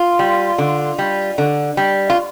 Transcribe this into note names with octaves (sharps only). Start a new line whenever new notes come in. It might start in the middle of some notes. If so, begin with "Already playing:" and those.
Already playing: F4
G3
D3
G3
D3
G3
F4